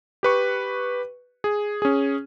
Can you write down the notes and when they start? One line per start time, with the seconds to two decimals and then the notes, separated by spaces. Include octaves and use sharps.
0.23 G4 B4 C#6
1.44 G#4
1.82 C#4 G#4